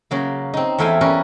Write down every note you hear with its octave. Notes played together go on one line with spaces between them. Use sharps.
C#3 F#3 A#3
C4 D#4
E2 A3 E4 F5 G5 G#5
G3 C#4 A#4 B4